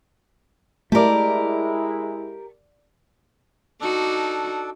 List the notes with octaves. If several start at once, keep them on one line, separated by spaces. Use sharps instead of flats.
G#3 A3 E4 G4 A#4 D5 A5
D4 D#4 F#4 A4 D6